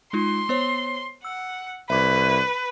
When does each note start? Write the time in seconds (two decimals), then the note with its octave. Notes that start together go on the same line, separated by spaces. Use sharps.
0.13 G#3 D#4 F4 C6
0.49 B3 C5 C#5
1.25 F#5 E6
1.90 C2 B4 E5 D6